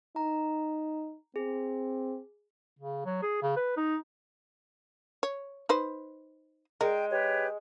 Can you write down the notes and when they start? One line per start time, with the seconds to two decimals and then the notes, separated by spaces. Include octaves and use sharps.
0.16 D#4 A#5
1.36 C4 G#4
2.79 C#3
3.05 F#3
3.22 G#4
3.43 C#3
3.57 B4
3.77 D#4
5.23 C#5
5.69 D#4 B4 C5
6.81 G#3 A#4 G5
7.10 G4 B4 C#5